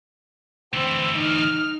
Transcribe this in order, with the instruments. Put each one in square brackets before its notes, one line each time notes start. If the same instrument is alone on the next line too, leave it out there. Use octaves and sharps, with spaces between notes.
[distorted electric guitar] D2 E3 [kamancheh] C4 E6
[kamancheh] D#4 F6